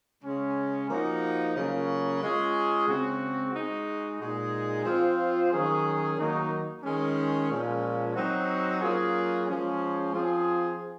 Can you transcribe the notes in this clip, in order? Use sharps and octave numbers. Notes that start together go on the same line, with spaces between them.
C#3 G#3 C#4
F3 A#3 D#4 F#4
C#3 F#3 A#3 C#4 F4
G#3 C#4 F4 G#4
C#3 G#3 C4 F#4
G#3 D#4 F#4
A#2 G#3 D#4 G#4
F3 C4 F4
D#3 F#3 C#4 G#4
D#3 F#3 A#3 D#4 F#4
D#3 G#3 C#4
A#2 F3 G#3 C#4
F#3 C4 D#4 F#4
F#3 A#3 C#4 F4 G#4
F3 G#3 C#4
F3 C4 F4 G#4